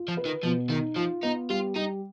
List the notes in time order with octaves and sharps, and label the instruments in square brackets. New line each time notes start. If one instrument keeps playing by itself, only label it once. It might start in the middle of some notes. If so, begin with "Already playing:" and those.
Already playing: [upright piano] F4
[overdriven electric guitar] F3
[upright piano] B4
[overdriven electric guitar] D#3
[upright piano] B2 [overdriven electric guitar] F3
[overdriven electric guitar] D#3 [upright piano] D#4
[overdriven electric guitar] F3 [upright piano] F4
[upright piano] B3 [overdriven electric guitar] D#4
[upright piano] G3 [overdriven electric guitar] F4
[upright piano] G3 [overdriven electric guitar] D#4